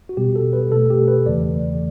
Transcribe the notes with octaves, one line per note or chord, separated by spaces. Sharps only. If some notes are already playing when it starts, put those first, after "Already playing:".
F#4
B2 G3 B3 G4
A4
B4
B2 A3 A4
G4
B4
E2 C#3 E3 A3 D5